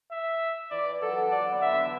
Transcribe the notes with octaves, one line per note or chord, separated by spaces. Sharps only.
E5
E3 D5
E3
F#3 A4
F#3
D4
F#3 D5
D3
B3
D4 E5
D3
E3